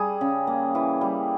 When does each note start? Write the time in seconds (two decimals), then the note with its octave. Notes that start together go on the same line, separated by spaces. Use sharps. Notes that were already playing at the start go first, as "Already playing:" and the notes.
Already playing: G3 G#4
0.21 C#3
0.47 A#3
0.75 E3
1.01 G3